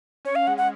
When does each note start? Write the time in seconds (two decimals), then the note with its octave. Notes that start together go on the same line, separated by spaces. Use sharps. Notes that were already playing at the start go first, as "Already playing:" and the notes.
0.25 C#4 C#5
0.35 F5
0.47 G#3 F#5
0.57 F#5